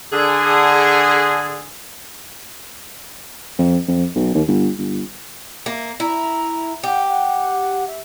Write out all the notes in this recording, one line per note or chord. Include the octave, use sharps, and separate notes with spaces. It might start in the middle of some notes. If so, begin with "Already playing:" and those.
D3 G#4
F2
F2
B1
D#2
G1
G1
A#3 E5
E4 A#5
G4 F#5
F#5
E5